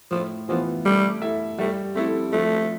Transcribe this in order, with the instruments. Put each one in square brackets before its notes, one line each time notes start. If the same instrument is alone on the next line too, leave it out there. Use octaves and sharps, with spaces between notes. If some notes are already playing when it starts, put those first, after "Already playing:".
[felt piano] A2 [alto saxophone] F3
[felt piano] E3 B3 F4 [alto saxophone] F3
[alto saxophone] G3 [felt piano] A3
[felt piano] E4 A4 E5
[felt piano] G3 [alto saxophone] A3
[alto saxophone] A3 [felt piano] C4 E4 A4
[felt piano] F3 [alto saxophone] A3